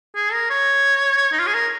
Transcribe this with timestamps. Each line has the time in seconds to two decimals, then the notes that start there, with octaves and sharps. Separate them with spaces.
0.15 G#4
0.32 A#4
0.50 C#5
1.33 D#4
1.39 F4
1.47 G#4
1.54 A#4